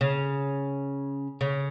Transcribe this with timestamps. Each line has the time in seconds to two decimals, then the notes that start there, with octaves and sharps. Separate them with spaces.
0.01 C#3
1.41 C#3